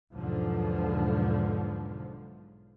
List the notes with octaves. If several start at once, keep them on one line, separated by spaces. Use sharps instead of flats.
B1 E2 G#2 D3 F3